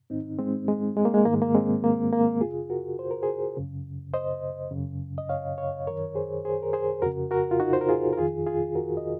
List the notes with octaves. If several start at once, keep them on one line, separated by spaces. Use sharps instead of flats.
G#2 D#3 C4 D#4
G#3 C4
G#3
G#3
A#3
G#3
G#2 D#3 A#3
G#3
A#3
G#3 C4
A#3
A#3
F#2 C#3 F4 G#4
F#4 A#4
C5
A#4
G#4 C5
F#2 C#3
C5 D#5
F#2 C#3
D#5
C#5 F5
C#5 F5
F#2 D#3 A#4 C#5
G#4 C5
G#4 C5
A#4
G#4 C5
F2 C#3 F#4 A#4
F#4 A#4
F4
D#4 F#4
C5
A#4
F4 G#4
A#4
F2 D#3 F4 G#4
F4 G#4
F#4 A#4
D#5